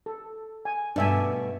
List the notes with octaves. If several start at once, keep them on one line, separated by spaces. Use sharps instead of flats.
A4
G#5
G2 B2 A3 D4 E5 G#5